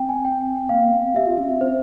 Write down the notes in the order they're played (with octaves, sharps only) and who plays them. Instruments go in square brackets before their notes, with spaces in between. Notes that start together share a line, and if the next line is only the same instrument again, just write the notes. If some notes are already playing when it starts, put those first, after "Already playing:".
Already playing: [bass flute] C4 [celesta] G5
[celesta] G#5
G5
[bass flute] A#3 [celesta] F5
[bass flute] C4
[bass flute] G4 [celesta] E5
[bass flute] F4
C#4
C4
[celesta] C5